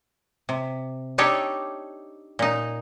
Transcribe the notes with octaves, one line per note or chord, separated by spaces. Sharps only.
C3
D4 D#4 G4 A4 C#5
A#2 D#4